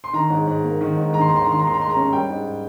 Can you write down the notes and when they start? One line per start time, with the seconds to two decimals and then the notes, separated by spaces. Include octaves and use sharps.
0.04 C6
0.13 D#3 A#5
0.30 G#2
0.47 G#2
0.64 A#3
0.81 D#3
0.97 G#2
1.13 D#3 A#5
1.21 C6
1.29 D#2 A#5
1.36 C6
1.44 D#3 A#5
1.52 C6
1.59 A#5
1.63 D#2 C6
1.74 A#5
1.80 G#3 C6
1.90 A#5
1.96 C#4
2.13 G3 G5
2.29 G#2